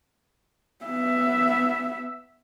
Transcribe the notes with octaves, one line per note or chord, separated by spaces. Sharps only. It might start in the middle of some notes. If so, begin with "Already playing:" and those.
B3 E5